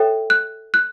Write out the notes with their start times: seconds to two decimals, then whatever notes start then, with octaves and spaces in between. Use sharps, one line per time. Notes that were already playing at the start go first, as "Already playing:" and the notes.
Already playing: A4 C#5 E5 G5
0.30 F#6
0.74 F#6